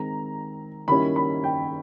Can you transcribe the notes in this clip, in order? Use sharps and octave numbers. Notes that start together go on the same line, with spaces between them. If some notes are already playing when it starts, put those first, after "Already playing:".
Already playing: D#3 G#3 C4 A#5
D#3 G3 A#3 C#4 E4 B5
B5
G5